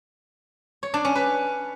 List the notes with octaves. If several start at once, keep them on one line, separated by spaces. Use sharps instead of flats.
C#5
D4
C#4
B4